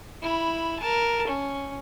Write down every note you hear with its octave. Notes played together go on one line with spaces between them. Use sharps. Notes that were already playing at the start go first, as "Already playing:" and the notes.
E4 B5
A#4 A5
C#4